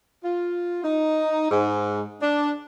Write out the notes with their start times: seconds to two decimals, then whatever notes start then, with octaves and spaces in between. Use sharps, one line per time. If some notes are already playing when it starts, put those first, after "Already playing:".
0.24 F4
0.83 D#4
1.51 G#2
2.21 D4